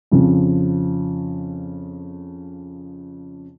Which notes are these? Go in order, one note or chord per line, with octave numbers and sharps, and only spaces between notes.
F2 C#3 F3